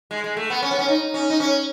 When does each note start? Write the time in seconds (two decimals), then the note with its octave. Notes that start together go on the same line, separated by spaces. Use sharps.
0.11 G#3
0.24 G#3
0.37 A3
0.50 B3
0.62 C#4
0.71 B3
0.79 C#4
0.88 D#4
1.14 C#4
1.30 D#4
1.40 C#4